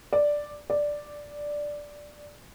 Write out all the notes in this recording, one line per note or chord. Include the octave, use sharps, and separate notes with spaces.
D5
D5